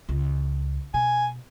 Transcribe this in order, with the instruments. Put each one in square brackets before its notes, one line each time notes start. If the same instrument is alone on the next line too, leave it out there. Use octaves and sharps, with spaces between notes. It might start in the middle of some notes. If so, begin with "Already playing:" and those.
[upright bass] C#2
[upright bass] B2 [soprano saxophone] G#5